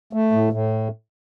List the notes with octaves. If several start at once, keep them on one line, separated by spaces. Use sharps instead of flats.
A3
A2
A2